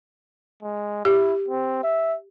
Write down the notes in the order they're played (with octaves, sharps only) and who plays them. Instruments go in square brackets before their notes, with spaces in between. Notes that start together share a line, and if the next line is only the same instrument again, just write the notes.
[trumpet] G#3
[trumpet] E4 [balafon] G4
[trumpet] C4
E5